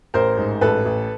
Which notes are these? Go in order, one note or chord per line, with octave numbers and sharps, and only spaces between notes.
A1 A#4 C5
G#2
A1 A4 B4
A1